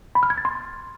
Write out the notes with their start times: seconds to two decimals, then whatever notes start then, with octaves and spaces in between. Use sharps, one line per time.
0.15 B5
0.23 F6
0.30 G#6
0.38 A6
0.45 C6